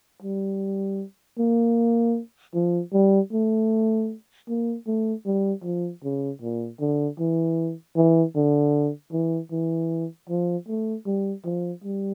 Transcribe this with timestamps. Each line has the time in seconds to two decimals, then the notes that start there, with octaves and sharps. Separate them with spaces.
0.22 G3
1.38 A#3
2.54 F3
2.93 G3
3.32 A3
4.48 A#3
4.87 A3
5.26 G3
5.64 F3
6.04 C#3
6.42 A#2
6.80 D3
7.19 E3
7.96 E3
8.36 D3
9.12 E3
9.51 E3
10.30 F3
10.68 A3
11.06 G3
11.45 F3
11.84 G3